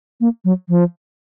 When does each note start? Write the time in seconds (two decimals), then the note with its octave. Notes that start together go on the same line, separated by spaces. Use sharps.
0.21 A#3
0.45 F#3
0.69 F3